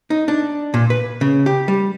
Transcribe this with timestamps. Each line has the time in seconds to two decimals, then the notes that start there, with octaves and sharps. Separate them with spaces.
0.10 D#4
0.28 D4
0.74 A#2
0.90 B4
1.21 C#3
1.46 G4
1.68 G3